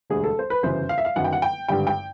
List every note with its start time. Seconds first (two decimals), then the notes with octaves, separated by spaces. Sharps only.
0.10 E1 D2 D3 G3 G#4
0.24 A4
0.39 C5
0.50 B4
0.63 G1 F#2 C#3 E3 C5
0.89 F5
0.98 E5
1.05 F5
1.16 G1 F#2 D#3 F#5
1.24 G5
1.33 F#5
1.42 G5
1.68 G#1 G2 D3 G3 G5
1.87 G5